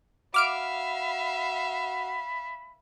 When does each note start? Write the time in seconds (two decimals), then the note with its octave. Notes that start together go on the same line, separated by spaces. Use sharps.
0.34 F#4 E5 F5 B5 D6 F6 D7